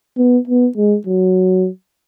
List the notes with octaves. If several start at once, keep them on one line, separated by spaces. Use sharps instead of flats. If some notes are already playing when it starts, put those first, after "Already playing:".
B3
B3
G#3
F#3